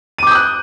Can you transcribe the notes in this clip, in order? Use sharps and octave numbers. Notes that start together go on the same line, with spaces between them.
D6 D#6 F#6 G6 D#7